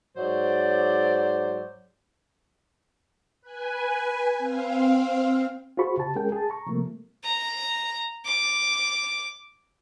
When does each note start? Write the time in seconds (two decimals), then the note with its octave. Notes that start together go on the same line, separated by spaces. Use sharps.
0.17 G#2 F#3 C5 D5
3.42 B4 G#5
4.38 C4 F5
5.77 F4 F#4 G#4 C5 B5 C#6
5.97 C#3 G4 A5
6.15 G#3 C#4 G#4 A#4 G5
6.32 G#4 A5
6.50 A#5 C#6
6.67 C3 F3 G3 A3 A#3
7.24 A#5
8.25 D6